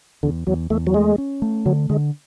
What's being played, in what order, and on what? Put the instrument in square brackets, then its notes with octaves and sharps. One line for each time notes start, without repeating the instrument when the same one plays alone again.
[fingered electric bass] E2 [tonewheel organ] D3
[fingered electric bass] E2 [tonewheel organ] F#3
[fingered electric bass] E2 [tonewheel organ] A3
[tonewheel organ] F#3
[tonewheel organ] G#3 [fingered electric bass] A3
[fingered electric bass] C#4
A3
[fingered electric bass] D3 [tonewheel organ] F#3
[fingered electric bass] D3 [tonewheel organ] G#3